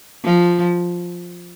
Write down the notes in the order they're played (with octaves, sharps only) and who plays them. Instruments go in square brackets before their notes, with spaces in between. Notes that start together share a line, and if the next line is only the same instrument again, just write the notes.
[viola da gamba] F3